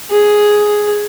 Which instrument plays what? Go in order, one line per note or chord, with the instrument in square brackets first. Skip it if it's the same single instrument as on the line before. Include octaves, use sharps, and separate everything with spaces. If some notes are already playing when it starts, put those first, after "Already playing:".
[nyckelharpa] G#4